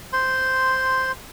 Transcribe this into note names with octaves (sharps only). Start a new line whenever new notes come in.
C5 C6